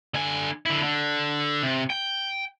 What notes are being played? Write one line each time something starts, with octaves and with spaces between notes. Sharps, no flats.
D3 G#5
D3 E4
D3
C3
G5